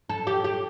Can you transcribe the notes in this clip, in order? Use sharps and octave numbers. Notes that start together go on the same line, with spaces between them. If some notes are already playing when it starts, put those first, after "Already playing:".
A4
G4
G4